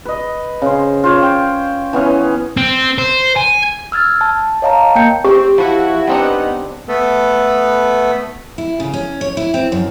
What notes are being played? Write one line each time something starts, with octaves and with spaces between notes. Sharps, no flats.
B4 D#5
C#3 C5
F4 C5 C#5
F5 G5
E3 B3 C#4
C4
C5
G#5
E6 F6 G#6 A6
A5
C#5 D#5 F5 A5 A#5
A#3 G5 G6 C#7
C4 G4
F3 E4 F#4
G3 B3 C4 D4 D#4 F#5
A3 B3 A4 B4
E4
C#3
C#4
C#5
E4
C4
F#2